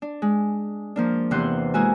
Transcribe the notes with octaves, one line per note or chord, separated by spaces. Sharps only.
D4
G#3
F3 A#3 D4
E2 C3 E3 C5 F#5 C6
G#3 A#3 E4 F#4 G#5